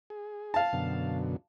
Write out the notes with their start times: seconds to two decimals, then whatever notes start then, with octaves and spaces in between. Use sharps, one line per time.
0.10 G#4
0.54 F5 A5
0.73 F#2 B2 D3